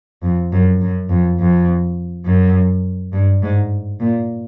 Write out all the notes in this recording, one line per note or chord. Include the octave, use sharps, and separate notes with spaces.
F2
F#2
F#2
F2
F2
F#2
G2
G#2
A#2